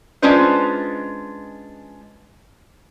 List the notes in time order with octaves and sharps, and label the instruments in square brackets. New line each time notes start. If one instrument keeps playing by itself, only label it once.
[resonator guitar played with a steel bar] G#3 C#4 D4 F4 B4 C5